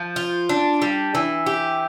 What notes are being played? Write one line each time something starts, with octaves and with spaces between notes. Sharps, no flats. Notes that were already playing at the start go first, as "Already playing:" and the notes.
Already playing: F3
F4
D4
G3
E3
G4